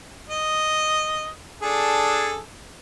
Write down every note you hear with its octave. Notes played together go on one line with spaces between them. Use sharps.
D#5
D4 G#4 A4